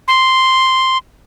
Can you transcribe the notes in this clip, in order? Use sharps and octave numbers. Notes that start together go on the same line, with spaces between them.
C6